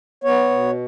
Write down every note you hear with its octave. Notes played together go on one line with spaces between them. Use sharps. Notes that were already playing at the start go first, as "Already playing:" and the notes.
B3 C#5
B2